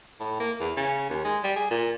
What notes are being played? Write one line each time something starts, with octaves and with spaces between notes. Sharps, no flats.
A2
A#3
E2
C#3
D#2
G#3
G3
G#4
A#2